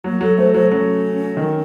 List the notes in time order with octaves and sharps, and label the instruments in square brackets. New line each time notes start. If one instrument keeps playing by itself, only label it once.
[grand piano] F#3 [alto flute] A#3
[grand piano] F#3 [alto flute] A4
[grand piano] A3 [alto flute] C5
[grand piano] F#3 [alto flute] C5
[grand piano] F#3 [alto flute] C#4
[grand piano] D#3